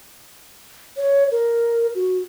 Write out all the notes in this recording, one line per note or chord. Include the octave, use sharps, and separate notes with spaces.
C#5
A#4
F#4